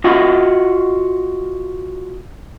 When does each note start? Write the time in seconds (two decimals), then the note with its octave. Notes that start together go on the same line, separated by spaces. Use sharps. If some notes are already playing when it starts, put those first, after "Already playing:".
0.04 F4 F#4 D#5 E5 F#5